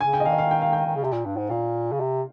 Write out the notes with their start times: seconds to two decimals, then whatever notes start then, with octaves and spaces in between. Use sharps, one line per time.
0.01 C#3 G#5
0.14 G5
0.20 D#5
0.25 D#3 F5
0.32 D#5
0.38 F5
0.51 G5
0.62 F5
0.73 G5
0.86 D#3
0.95 C#3
1.04 C3
1.12 A#2
1.26 G2
1.37 G#2
1.50 A#2 F5
1.92 C#3
2.00 C3